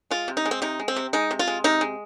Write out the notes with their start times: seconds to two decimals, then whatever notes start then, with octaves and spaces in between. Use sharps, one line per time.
0.11 G#3 F4
0.28 C3
0.37 D#4
0.46 G#3
0.51 C4
0.62 C3 D#4
0.79 G#3
0.88 C4
0.96 C3
1.13 G#3 D#4
1.31 C3
1.39 F4
1.48 G#3
1.64 C3 D#4
1.81 G#3